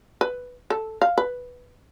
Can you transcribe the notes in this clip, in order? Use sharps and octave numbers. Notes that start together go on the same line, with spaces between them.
B4
A4
F5
B4